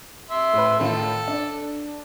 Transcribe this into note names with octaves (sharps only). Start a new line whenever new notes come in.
E5 C6
A2 B4
A2 D#3 F4 A4
D4